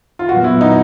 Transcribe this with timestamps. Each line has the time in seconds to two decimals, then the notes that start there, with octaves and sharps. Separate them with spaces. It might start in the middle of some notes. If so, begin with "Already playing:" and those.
0.19 F4
0.28 A#2 F#3 B3 F#4
0.44 E4
0.61 D#4